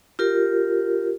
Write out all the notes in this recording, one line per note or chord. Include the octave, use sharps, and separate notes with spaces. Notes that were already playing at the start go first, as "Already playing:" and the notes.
F4 G4 A#4